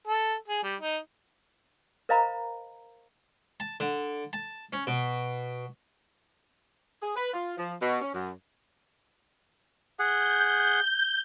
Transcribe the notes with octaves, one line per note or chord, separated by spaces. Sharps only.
A4
G#4
G3
D#4
A#4 C5 D#5 F5 A#5 B5
A5
D3
A5
C#4
B2
G#4
B4
F4
F3
B2
C#4
F#2
G#4 F#5 G6